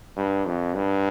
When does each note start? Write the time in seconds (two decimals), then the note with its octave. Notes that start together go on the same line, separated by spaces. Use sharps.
0.17 G2
0.46 F2
0.76 G2